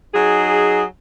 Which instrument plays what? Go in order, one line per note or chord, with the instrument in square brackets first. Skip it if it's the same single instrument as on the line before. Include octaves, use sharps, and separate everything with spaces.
[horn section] F#3 D#4 G#4